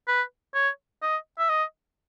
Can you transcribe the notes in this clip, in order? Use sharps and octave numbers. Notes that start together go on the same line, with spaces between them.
B4
C#5
D#5
E5
D#5